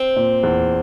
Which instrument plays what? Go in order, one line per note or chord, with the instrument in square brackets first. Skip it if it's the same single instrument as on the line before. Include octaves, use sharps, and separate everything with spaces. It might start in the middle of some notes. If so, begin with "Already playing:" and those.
Already playing: [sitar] C4
[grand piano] A#2
E2